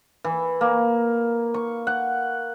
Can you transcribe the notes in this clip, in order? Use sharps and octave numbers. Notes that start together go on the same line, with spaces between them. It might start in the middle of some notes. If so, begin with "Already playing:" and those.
E3
A#3
C#6
F#5